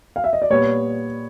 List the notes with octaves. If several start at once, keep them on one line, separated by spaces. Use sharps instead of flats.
F5
E5
D#5
D5
A#2 G3 B3 C#5